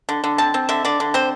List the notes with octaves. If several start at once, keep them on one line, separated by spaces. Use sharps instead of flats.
D3
D3
C4 A5
C4
D3 E5
D3 D5
D3
C4 C5